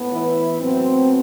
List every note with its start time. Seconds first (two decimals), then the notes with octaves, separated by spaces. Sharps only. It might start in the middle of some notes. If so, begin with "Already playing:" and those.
Already playing: A2 B3
0.13 E3 E4
0.60 A2 F#3 B3 C4